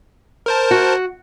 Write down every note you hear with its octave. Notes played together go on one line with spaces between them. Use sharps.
A#4 C5 A5
F#4